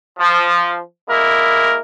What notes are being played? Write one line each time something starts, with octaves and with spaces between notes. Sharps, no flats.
F3
G#3 A#3 E4 A#4